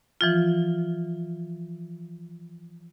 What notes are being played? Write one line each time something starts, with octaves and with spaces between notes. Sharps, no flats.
E3 F3 F4